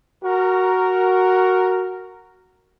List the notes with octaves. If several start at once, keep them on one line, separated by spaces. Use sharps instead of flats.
F#4 A#4